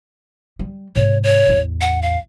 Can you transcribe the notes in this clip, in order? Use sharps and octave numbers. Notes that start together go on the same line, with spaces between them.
G3
G#2 C3 C#5
C#5
A1 E2
F#5
F5